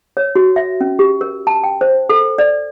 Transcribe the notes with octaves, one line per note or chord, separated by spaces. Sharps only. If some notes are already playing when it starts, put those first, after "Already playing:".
C#5
F#4
E5
C#4
G4
A#4
A5
G5
C5
A4
D5